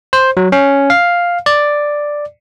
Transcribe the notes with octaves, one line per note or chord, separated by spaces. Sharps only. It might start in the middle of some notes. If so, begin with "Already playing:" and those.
C5
F#3
C#4
F5
D5